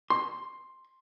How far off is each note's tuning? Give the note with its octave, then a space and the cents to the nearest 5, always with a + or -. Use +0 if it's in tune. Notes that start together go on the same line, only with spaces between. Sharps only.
C6 +10